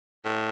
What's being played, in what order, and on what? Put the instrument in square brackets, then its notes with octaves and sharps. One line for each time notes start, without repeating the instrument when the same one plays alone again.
[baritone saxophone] A2